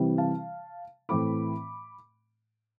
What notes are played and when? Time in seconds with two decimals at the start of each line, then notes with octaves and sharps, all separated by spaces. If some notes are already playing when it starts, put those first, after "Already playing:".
Already playing: C3 E3 G3 C4 E4
0.18 F5 A5
1.09 A2 E3 A3 C4 E4 B5 D6